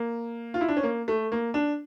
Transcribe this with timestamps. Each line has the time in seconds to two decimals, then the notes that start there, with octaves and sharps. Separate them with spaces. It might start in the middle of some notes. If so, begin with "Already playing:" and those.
Already playing: A#3
0.54 F4
0.61 E4
0.69 D4
0.77 C#4
0.83 A#3
1.08 A3
1.32 A#3
1.54 D4